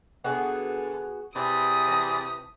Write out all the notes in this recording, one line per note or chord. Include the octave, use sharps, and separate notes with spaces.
D3 B3 F#4 G#4
C3 E4 G#4 B4 D5 A5 D#6 B6
E3 A5